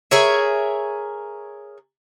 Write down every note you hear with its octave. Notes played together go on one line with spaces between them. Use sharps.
G#4 A#4 C#5 E5